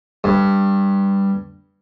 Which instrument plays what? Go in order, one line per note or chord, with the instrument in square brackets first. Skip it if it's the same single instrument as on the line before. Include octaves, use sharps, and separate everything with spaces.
[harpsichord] G2